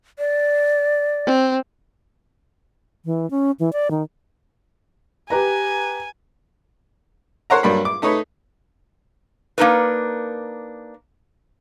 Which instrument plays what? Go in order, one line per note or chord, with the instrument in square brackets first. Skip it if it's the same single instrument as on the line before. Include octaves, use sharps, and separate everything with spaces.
[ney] D5
[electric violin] C4
[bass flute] E3
C#4
E3
D5
D#3
[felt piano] G4 B4 A#5 [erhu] G#5
[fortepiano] A#4 C5 C#5 F#5 A#5
G2 F#3 G3 A#3 B5
D6
A3 D#4 B4 C#5
[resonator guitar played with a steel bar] A#3 D4 D#4 A#4 B4